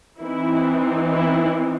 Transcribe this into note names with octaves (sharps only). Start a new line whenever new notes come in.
E3 C4 D#4 E4
E4